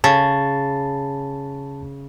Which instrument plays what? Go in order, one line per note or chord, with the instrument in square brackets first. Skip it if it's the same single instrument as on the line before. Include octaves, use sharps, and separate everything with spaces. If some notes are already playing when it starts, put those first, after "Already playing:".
[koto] C#3 [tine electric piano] A5 A6